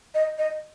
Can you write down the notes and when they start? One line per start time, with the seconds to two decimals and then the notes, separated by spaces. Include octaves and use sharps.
0.15 D#5
0.38 D#5